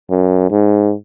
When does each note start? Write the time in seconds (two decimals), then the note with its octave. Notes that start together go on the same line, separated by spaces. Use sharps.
0.10 F#2
0.51 G#2